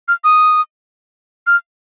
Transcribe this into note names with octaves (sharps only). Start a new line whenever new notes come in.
F6
D#6
F6